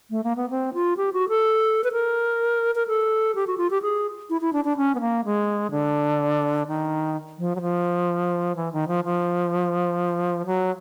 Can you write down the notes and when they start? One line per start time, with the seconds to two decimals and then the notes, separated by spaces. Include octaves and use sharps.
0.10 A3
0.24 A#3
0.36 B3
0.50 C4
0.74 F4
0.97 G4
1.13 F#4
1.29 A4
1.84 B4
1.92 A#4
2.75 A#4
2.88 A4
3.35 G4
3.47 F#4
3.58 F4
3.71 G4
3.82 G#4
4.30 E4
4.41 E4
4.53 D4
4.65 D4
4.77 C#4
4.95 B3
5.01 A#3
5.25 G#3
5.71 D3
6.67 D#3
7.38 F3
7.56 F#3
7.61 F3
8.56 E3
8.73 D#3
8.88 F3
9.04 F3
10.46 F#3